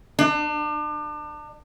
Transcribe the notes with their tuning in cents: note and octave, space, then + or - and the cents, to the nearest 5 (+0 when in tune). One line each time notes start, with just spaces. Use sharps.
D4 +35